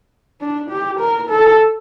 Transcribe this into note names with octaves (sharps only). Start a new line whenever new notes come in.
D4
G4
A#4
A4